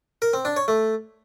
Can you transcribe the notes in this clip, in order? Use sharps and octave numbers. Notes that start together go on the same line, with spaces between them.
A#4
C4
D4
C#5
A3